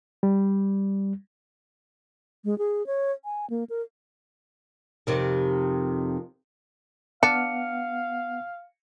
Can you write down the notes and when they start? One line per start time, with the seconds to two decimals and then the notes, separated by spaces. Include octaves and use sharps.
0.23 G3
2.45 G#3
2.58 G#4
2.87 C#5
3.25 G#5
3.50 A#3
3.70 A#4
5.07 F2 C3 D#3
7.23 B3 D4 F5 F#5 F6 C#7